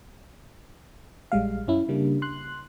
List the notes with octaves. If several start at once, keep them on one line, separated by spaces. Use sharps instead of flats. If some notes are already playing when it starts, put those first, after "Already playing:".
A#1 G3 G#3 F5
F#2 C#4 E4
C#3 G3 A#3 D4
C6 F#6